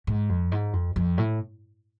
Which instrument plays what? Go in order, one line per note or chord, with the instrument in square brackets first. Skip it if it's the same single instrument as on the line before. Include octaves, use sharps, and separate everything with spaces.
[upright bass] G#2
F2
G#2
F2
F2
A2